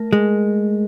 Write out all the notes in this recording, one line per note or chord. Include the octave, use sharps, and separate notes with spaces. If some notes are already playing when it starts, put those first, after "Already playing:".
Already playing: A3 A#4
G#3